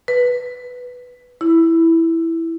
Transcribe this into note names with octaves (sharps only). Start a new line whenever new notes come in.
B4
E4